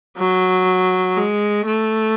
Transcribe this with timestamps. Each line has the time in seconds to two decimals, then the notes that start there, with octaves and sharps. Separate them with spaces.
0.18 F#3
1.17 G#3
1.66 A3